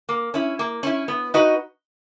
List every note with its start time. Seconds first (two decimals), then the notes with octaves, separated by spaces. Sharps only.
0.09 A#3
0.34 C#4 E4
0.59 A#3
0.83 C#4 E4
1.08 B3
1.34 D#4 F#4 B4 D#5